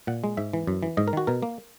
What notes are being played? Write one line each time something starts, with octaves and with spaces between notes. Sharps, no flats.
A#2 F#5
G#3
G#2 E5
E3
F#2
E3
G#2 D#5
A#4
D#3 F#4
B2 A#4
A#3